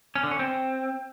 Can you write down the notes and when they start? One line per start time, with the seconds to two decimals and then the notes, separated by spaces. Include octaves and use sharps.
0.15 C#4
0.23 D3
0.31 C#4
0.39 C4